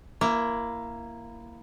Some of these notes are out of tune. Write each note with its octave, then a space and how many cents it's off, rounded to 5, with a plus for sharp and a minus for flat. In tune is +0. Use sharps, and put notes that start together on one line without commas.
A#3 +0 E4 +20